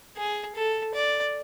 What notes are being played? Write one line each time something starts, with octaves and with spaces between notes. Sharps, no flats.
G#4
A4
D5